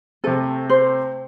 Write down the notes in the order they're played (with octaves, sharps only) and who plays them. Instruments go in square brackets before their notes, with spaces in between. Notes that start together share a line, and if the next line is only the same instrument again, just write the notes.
[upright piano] C3 A3 C4 [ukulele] A4
[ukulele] C5